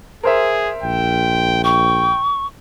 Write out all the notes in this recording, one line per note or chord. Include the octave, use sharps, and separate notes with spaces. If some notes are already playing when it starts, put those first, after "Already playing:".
G#4 A#4 C5 E5
A#1 G5
G5 C#6